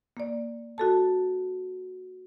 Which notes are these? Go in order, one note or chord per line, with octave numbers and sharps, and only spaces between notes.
A#3 D5
F#4 A4 A5